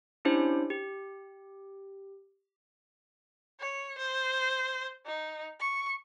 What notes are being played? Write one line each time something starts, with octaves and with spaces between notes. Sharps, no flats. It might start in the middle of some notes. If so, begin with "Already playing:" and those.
C#4 D4 E4 G4 C5
G4
C#5
C5
D#4
C#6